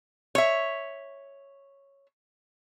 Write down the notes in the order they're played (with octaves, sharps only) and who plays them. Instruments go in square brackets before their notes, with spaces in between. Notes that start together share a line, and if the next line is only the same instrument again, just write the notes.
[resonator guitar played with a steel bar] C#5 E5